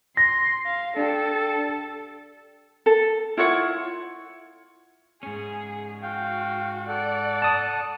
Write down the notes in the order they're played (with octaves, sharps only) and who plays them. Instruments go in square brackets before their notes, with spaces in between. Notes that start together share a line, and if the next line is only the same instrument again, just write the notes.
[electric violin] C6 [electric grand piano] A#6
[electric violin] F5
[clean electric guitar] D4 G4 [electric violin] A4
[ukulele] A4
E4 F4 C#5 F#5
[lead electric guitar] G#2 C#4 [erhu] G#4
[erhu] F#4 [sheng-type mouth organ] F5 G5
[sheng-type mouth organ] A4 F#5 [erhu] D5
[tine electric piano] A5 D#6